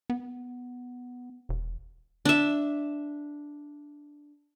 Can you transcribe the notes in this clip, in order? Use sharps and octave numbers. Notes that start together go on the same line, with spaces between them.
B3
E1
D4 E5